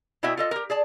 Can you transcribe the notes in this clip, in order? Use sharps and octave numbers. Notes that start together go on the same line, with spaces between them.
B2 E4 F#4 D#5 E5 G5
F4 A4 D#5
G4 A#4
G#4 D5 A5